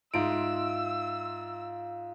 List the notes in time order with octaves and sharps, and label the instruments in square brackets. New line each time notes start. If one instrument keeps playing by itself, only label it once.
[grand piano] G#2 D7 [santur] F4 E5 [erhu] E6